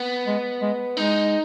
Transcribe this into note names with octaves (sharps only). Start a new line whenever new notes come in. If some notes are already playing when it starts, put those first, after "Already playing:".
Already playing: B3
G#3
G#3
G#3 D#4